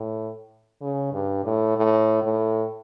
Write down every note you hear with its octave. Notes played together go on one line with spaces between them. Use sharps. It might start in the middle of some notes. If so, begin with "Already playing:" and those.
Already playing: A2
C#3
G2
A2
A2
A2